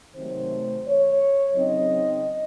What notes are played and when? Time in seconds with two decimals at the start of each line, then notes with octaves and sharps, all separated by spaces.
0.15 C3 D#3 F#3 A3 C5
0.85 C#5
1.54 C#3 F#3 C4 D#4 D#5